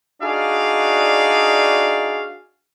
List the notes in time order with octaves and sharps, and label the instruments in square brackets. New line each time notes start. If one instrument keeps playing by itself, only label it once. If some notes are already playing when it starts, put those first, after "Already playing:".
[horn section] D4 D#4 F#4 G#4 D5 F5